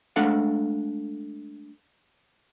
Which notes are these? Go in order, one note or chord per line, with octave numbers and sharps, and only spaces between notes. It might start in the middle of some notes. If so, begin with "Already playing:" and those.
G#3 A3 D4 A4 F5 F#5